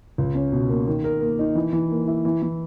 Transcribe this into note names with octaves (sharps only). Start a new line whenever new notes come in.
C#2
C#4
B2
A#3
D#3
A#4
A#3
D#4
E3
E3
A#3
E4
E3
E3